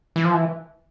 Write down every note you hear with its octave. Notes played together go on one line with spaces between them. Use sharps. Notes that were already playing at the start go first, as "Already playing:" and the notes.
E3
F3
E3